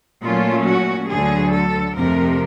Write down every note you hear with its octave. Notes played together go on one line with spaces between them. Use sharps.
A#2 F#3 A3 C#4 F4
F#4
D2 D3 F#3 G#4
A4
F2 C3 F3 A3 A#4